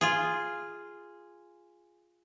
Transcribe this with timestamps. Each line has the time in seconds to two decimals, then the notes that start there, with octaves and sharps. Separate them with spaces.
0.01 F4 G#4